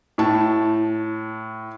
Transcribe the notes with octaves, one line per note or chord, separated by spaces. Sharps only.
A2 A5